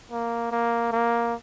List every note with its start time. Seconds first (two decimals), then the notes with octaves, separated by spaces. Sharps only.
0.11 A#3
0.51 A#3
0.92 A#3